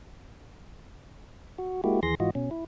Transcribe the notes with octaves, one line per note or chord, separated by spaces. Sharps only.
F#4
G#3 A#3 E4 F#4 G4
D#2 E3 G#4 C6 A#6
G#2 E3 F4 F#4 D#5
B2 C#4
E4